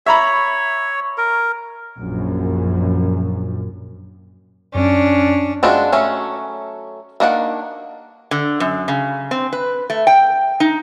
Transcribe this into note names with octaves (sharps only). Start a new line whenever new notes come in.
C#5 E5 A#5 B5
A#4
A#1 F#2
F#2 C#4 D4
G#3 C4 D4 F4 F#4
F#3 A3 C#4
D#3 A#3 D4 F#5
D3
F#2
C#3
C4
B4
A3
G5
D#4